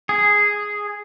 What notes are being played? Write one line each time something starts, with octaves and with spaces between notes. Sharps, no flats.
G#4